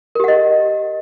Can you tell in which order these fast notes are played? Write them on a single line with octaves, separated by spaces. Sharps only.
A#4 G4 F#5 D#5